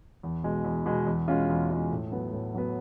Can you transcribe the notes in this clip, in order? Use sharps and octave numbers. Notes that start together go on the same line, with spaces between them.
E2
B2 G#3
E2
B2 G#3
E2
B2 G#3 C#4 F4
E2
B2 G#3 C#4 F4
A2
F#3 B3
A2
F#3 B3